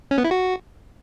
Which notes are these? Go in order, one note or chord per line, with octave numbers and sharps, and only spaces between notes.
C#4
B3
E4
F#4